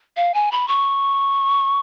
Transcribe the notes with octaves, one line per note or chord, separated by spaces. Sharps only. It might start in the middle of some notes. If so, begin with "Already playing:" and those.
F5
G#5
B5
C#6